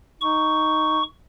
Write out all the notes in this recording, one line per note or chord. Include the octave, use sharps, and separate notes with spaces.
D#4 C#6